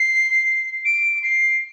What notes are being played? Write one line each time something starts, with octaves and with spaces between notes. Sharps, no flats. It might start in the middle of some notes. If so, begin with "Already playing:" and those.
Already playing: C7
D7
C7